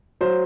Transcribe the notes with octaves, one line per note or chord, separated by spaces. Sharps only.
F#3 C5